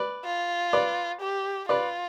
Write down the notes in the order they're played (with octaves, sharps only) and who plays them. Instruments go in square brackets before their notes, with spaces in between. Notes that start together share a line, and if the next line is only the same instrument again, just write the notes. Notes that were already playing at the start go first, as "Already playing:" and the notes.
Already playing: [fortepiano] B4 D5
[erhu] F4
[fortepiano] B4 D5
[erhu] G4
[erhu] F4 [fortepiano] B4 D5